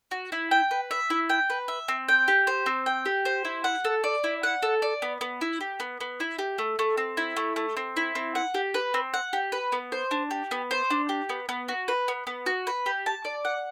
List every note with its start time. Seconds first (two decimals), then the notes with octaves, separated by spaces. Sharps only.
0.11 F#4
0.32 E4
0.51 G5
0.71 B4
0.91 E5
1.10 E4
1.30 G5
1.50 B4
1.68 E5
1.88 C4
2.08 G5
2.28 G4
2.47 C5
2.66 C4
2.86 G5
3.06 G4
3.25 C5
3.45 E4
3.64 F#5
3.85 A4
4.04 D5
4.24 E4
4.43 F#5
4.62 A4
4.82 D5
5.02 B3
5.21 B3
5.41 E4
5.61 G4
5.80 B3
6.01 B3
6.20 E4
6.39 G4
6.58 A3
6.79 A3
6.97 C4
7.17 E4
7.37 A3
7.56 A3
7.77 C4
7.97 E4
8.15 C4
8.35 F#5
8.54 G4
8.74 B4
8.94 C4
9.14 F#5
9.33 G4
9.52 B4
9.72 B3
9.92 C5
10.11 D4
10.31 G4
10.51 B3
10.71 C5
10.90 D4
11.09 G4
11.29 B3
11.49 B3
11.68 F#4
11.88 B4
12.08 B3
12.27 B3
12.46 F#4
12.67 B4
12.86 G4
13.06 A5
13.25 D5
13.45 F#5